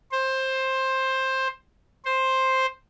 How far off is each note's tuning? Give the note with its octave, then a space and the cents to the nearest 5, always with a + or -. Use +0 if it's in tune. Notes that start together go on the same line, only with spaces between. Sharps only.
C5 +15
C5 +5